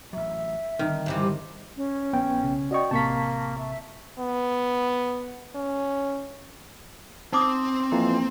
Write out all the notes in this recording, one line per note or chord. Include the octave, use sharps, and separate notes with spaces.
A1 F#3 E5
D3 D#3 G3 C4
G2 C3 E3
C#4
A#1 B3 G5
B1 C#3
F#4 D5 D#5 G5 C#6
A1 C3 A#3 A5 C#6 B6
E5
B3
C#4
C4 D#4 D6 D#6
F2 E3 A#3 F4